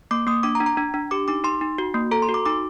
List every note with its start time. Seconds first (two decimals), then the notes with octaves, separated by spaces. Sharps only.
0.11 A#3 D6
0.27 A#3 D#6
0.43 D4 D6
0.55 A#5
0.60 D4
0.66 A#5
0.77 D4
0.94 D4
1.11 G4 D6
1.28 D#4 D6
1.44 D#4 C6
1.61 D#4
1.78 F#4
1.94 A#3
2.11 A4 A#5
2.22 C6
2.29 F#4
2.34 D6
2.45 D#4 D6